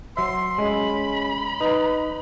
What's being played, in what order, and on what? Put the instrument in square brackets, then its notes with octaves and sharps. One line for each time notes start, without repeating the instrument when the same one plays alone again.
[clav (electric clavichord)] F#3 E5 [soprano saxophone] C6
[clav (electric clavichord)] G#3 [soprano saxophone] C#4 [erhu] B5
[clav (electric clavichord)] D#4 [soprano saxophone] B4